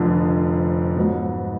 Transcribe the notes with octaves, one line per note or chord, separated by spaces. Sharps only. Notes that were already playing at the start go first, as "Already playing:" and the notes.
Already playing: F1 F2 D3
G#2 F#3 B3